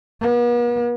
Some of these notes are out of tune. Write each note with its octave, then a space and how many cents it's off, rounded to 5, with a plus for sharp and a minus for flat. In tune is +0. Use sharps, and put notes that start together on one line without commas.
B3 -45